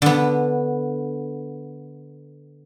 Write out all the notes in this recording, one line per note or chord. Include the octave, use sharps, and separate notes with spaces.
D3 B3